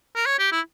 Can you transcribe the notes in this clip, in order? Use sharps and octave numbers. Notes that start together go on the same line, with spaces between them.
A#4
C#5
G4
E4